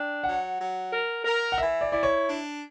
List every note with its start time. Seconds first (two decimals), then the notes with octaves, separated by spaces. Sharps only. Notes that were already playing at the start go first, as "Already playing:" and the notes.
Already playing: D4 G5
0.24 F#3 F#5
0.58 F#3
0.91 A#4
1.25 A#4
1.52 F#5
1.58 E3 E5
1.81 D5
1.92 E4 D5
2.03 C#5
2.25 D4